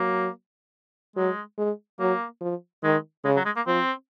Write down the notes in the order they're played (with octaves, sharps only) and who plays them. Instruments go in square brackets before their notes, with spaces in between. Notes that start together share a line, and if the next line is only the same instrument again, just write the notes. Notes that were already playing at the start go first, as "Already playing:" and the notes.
Already playing: [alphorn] F#3 [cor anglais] A#3
[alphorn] F#3 [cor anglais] G#3
[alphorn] G#3
[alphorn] F#3 [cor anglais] A#3
[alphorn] F3
[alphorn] D#3 [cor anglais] G#3
[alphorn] C#3 [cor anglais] G#3
[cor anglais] F#3
G#3
A#3
[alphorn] F3 [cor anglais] C4